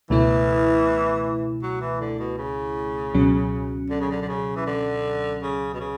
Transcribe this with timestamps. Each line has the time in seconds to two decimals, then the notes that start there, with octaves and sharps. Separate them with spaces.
0.10 C#2 B2 E3 A3 E4
1.63 F#3
1.81 E3
2.01 D3
2.19 B2
2.38 C#3
3.14 C#2 B2 F#3 C#4
3.90 D3
4.00 C#3
4.11 D3
4.22 D3
4.29 C#3
4.56 E3
4.67 D3
5.43 C#3
5.74 B2
5.81 C#3